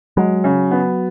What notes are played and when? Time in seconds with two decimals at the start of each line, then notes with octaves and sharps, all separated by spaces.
0.17 F#3 G#3
0.44 C#3
0.71 B3